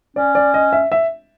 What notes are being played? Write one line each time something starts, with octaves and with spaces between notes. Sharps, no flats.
C#4 D5
D5
D#5
E5
E5